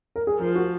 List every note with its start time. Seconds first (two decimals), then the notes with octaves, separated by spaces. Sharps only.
0.16 A#4
0.27 G#4
0.40 F3 A#4
0.55 F#4